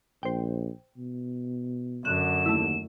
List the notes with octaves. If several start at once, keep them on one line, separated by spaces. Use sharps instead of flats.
A#1 C5 G5
B2
F#2 D3 F#6 E7
D#2 A3 E4